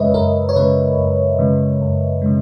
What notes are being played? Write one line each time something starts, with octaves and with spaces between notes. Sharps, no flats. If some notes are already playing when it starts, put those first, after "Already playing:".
Already playing: F#2 C#3 G#3 B4 C#5 D#5 E5
F#2 A#4
C#5
C#3 G#3 B4
F#2
C#3 G#3
F#2
C#3 G#3